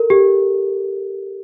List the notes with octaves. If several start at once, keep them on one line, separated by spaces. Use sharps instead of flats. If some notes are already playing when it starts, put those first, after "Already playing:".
Already playing: A4 A#4
G4